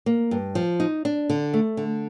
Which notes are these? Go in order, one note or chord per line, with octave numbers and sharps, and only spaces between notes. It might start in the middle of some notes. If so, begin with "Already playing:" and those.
A#3
G2
F3
D#4
D4
D3
A3
D3